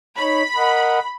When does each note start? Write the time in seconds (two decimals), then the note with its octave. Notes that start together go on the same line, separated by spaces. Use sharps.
0.19 D#4 C#5 B5
0.56 A#4 D#5 F#5